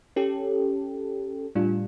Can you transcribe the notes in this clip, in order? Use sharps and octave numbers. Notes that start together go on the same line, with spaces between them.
C#4 G4 A4
A2 G3 D4 F4